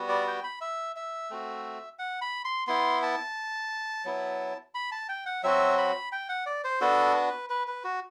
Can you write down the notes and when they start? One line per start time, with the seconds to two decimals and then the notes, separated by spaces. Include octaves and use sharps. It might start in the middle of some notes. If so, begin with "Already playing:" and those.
Already playing: G3 B3 F#4
0.09 D5
0.27 G5
0.44 B5
0.61 E5
0.96 E5
1.30 A3 C4 F#4
1.99 F#5
2.21 B5
2.45 C6
2.67 B3 E4 C6
3.03 A5
4.05 F#3 B3 E4
4.75 B5
4.92 A5
5.09 G5
5.26 F#5
5.43 F#3 C4 F#4 E5
5.78 B5
6.12 G5
6.29 F#5
6.46 D5
6.64 C5
6.81 B3 D4 F#4 A4
7.15 B4
7.49 B4
7.67 B4
7.84 F#4